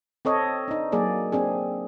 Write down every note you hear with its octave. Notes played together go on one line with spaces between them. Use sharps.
C4 A4 C#5 D#5
D4 D#4
F#3 A#3 G#4 D5
C4 D4 G#4